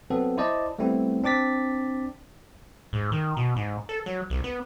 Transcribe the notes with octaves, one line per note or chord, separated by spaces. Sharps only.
F#3 B3 C4 A4
E4 C5 D5 D#5 A5
G3 A3 B3 C4 E4
C4 D4 D6 A6 B6
G#2
D#3
B2
G#2
A4
F#3
C2
B3